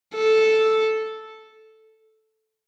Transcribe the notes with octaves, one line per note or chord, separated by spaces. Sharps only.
A4